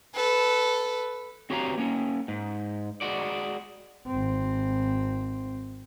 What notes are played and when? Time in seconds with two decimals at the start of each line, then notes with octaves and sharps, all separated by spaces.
0.15 A4 B4
1.50 C4 F#4 G4 C#5 F5 A#5
1.78 A#3 C#4
2.28 G#2
3.01 G#3 F#4 D5
4.07 G#1 C4